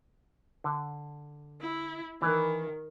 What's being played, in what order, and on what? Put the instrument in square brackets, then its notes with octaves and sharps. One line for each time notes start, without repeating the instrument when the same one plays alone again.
[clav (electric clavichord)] D3
[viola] E4
[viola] D#3 [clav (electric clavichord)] E3